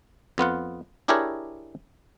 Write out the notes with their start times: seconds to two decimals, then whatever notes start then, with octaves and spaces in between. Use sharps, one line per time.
0.38 F2 B3 F4 F#5
1.08 D4 E4 G4 G#4 A#4 C#5